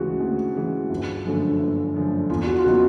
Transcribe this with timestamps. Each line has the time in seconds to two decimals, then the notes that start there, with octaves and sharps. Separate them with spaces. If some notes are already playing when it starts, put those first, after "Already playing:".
Already playing: D2 C#3 E3 G#3 F#4
0.20 D2
0.55 C#3 E3 G#3
0.90 G1
1.25 F#2 D3 F3 A3
1.60 G1
1.94 F#2 D3 F3 A3
2.30 E2 F4
2.47 F#4
2.58 F4
2.64 C#3 F#3 B3 D#4 F#4